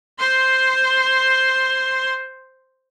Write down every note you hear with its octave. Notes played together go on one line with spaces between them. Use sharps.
C5 C6